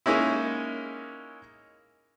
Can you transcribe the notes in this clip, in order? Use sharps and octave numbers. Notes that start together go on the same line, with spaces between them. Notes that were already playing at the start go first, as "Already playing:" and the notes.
G#3 A#3 C#4 D#4 E4